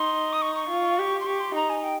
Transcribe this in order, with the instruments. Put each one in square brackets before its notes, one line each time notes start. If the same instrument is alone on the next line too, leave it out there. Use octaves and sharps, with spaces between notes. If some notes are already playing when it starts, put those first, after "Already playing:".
Already playing: [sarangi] D#4 [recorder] C6
[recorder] D#6
C#6
C#6
[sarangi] F4
G4
[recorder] C6
[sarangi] G4 [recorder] C#6
[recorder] C6
[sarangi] D#4 [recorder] A#5
[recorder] G#5
G5